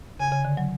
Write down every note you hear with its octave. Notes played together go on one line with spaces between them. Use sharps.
C#3 G#5
C#3
D3
F#3